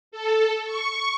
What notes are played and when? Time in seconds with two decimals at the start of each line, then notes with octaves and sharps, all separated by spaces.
0.12 A4
0.65 C#6